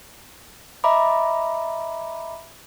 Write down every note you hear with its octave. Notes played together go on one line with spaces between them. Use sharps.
D#5 E5 A#5 B5 D6